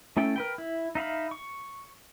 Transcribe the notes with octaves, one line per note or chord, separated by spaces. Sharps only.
A3 C#4 E4 A4 G5
A#4 B4 G5
E4
D#4 E5 F5 B5
C#6